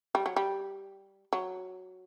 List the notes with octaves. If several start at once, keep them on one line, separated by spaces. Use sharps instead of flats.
G3
F#3
G3
F#3